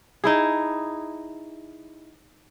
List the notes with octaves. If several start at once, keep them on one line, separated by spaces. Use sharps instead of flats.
D#4 E4 G#4